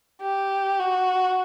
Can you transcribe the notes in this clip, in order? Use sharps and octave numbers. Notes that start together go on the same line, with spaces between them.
G4
F#4